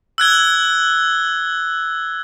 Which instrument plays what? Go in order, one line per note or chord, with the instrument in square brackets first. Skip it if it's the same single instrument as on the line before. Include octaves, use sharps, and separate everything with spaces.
[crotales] E6 F#6 G#6 G7